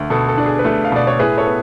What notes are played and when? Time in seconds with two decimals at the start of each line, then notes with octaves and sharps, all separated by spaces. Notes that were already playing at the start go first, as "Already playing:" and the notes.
Already playing: D2
0.10 B2 A4
0.29 A4
0.38 D4
0.46 G#4
0.59 B4
0.64 A3 A4
0.85 F5
0.92 B2 D5
1.07 C#5
1.19 A2 G#4 B4
1.37 A4 C#5
1.46 B3